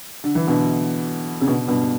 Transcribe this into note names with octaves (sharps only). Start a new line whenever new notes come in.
D3
E3
B2 D3
C#3
B2 D3
G2 B2